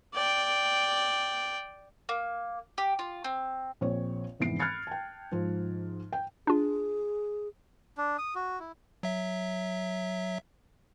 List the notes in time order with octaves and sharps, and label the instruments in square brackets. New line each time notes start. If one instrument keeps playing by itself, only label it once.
[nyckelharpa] D5 G5
[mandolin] A#3
G4
F4
C4
[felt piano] A#1 C4 C#5
F1 G#2 E3 B3 C7 D7
B5 F6 F#6 G#6 A6 C#7
G5 A5
G#2 F3
G5
[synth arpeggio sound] D4 F4 [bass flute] G#4
[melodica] D4
D#6
F#4
E4
[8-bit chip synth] F#3 E5